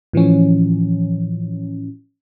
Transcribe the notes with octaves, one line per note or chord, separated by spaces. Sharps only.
A2 E3 F3 C#4